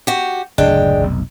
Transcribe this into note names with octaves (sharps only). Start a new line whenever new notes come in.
F#4 G4
F#1 D2 A2 G#3 D4 G5
F1 B1